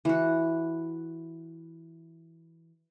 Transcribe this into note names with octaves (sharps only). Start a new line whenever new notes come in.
E3 F#4